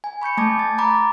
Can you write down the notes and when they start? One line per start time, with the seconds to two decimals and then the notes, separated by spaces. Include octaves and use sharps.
0.04 G#5
0.22 B5 C#6 G6 C#7
0.37 A3 A5 D6 G#6
0.59 A6
0.78 A#5 B5 D6 A6